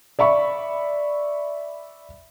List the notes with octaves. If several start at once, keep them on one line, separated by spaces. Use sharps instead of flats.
D5 E5 B5 C#6